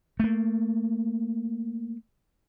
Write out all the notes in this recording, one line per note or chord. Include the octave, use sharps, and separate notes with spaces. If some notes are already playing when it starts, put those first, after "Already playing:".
A3 A#3